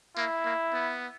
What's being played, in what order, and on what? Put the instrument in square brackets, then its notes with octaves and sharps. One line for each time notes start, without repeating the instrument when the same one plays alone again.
[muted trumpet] A#3 [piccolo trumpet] E4
[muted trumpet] A#3
B3